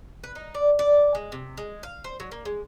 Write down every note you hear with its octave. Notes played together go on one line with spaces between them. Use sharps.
B4
D#4
D5
D5
G#3
C3
G#3
F5
C5
F#3
A#3
G#3